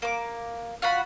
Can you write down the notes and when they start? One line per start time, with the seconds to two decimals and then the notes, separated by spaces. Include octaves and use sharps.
0.02 A#3 D6
0.82 F4 F#4 F#5 B5